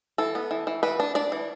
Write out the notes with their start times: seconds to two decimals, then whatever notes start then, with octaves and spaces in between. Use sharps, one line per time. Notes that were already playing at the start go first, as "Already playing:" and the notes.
0.18 E3 A4
0.35 B3
0.51 E3
0.67 E3
0.83 E3 B4
1.00 D4
1.15 D4 D5
1.32 E3